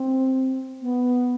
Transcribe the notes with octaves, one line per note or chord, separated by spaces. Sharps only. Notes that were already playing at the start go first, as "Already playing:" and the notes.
Already playing: C4
B3